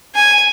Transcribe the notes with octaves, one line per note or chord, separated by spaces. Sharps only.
G#5